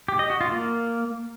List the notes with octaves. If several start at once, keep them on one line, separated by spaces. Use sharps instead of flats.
G4
D#5
F#4
F4
A#3